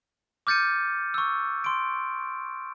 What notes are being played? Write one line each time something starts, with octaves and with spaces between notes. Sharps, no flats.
D6 F6 G6 A6 C#7 D#7
C#6 E6
C6 D7